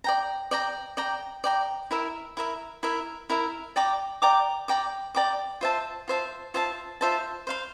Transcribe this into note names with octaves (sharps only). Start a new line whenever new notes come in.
D5 G5 A#5
D5 G5 A#5
D5 G5 A#5
D5 G5 A#5
E4 A#4 E5
E4 A#4 E5
E4 A#4 E5
E4 A#4 E5
D5 G5 A#5 D6
D5 G5 A#5 D6
D5 G5 A#5 D6
D5 G5 A#5 D6
F4 C5 E5 A5
F4 C5 E5 A5
F4 C5 E5 A5
F4 C5 E5 A5
C5 F5 C6